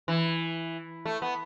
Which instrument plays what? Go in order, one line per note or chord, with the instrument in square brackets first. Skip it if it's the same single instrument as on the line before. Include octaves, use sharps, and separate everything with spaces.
[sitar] E3
A3
B3